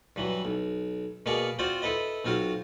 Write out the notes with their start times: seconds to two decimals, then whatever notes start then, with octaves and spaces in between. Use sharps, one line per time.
0.16 G2 E3 F#3
0.45 B1
1.26 B2 A#3 G#4 D5 F5 C#6
1.59 C4 F4 F#4 C5 D5
1.82 E4 A4 B4 D#5
2.25 B1 C4 F4 F#4 F5